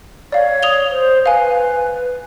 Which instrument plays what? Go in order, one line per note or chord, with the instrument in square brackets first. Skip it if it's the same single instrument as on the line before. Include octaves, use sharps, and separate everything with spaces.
[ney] C#5 [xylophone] D5 F5
[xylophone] D#6 F7 G7
[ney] C5
[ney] B4 [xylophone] F5 G#5